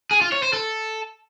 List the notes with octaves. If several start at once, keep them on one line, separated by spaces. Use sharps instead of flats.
G#4
F4
C#5
C5
A4